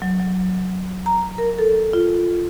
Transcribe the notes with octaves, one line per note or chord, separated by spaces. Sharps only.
F#3
F#3
A#5
A#4
A4
F4